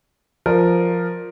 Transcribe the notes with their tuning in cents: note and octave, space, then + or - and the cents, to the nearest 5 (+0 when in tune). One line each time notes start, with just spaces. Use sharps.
F3 +0 A#4 +0 D5 +0